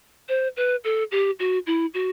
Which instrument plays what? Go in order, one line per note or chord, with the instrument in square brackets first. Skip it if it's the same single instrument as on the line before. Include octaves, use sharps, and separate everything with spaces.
[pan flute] C5
B4
A4
G4
F#4
E4
F#4